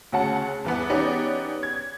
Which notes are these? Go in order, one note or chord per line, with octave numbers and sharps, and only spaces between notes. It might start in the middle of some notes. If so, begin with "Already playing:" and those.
D2 C#3 C#4 F#4 F#5 A5
E2 E3 B3
B3 C#4 D#4 G4 D5
G#6